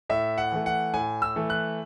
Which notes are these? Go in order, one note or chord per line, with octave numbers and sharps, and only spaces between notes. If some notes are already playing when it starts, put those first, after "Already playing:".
A2 E5
F#5
E3 A3
F#5
A2 G#5
E6
E3 A3
F#6